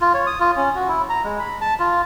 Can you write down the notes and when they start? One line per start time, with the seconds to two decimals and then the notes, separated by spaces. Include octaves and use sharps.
0.01 F4
0.14 C#5
0.27 D#6
0.40 F4
0.56 C#4
0.75 F#4
0.88 E4
1.09 A#5
1.24 G#3
1.39 B5
1.61 A5
1.79 F4